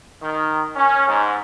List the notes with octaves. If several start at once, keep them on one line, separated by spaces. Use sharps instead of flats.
D#3
C#4
G#2